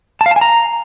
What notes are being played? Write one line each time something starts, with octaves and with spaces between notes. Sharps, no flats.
A5
F5
A5
G#5
A#5